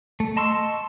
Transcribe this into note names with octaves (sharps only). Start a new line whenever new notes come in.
A3
D#5 A5 C6 C#6 E6